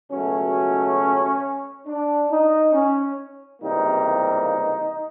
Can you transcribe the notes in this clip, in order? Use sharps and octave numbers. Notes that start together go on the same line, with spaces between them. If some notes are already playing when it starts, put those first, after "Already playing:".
C#2 B2 F#3 A3 C#4
D4
D#4
C#4
C#2 C3 E3 G3 A#3 D#4